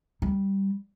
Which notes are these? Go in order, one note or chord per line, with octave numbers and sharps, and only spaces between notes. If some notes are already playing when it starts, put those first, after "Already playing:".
G3